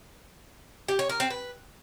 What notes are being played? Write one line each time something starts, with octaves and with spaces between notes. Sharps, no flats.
G4
C#5
A#4
C4
B4